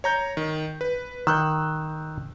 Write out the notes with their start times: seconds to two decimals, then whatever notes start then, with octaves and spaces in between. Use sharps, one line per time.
0.04 C#5 A#5 G6
0.37 D#3
0.81 B4
1.27 D#3 E6 F#6 G6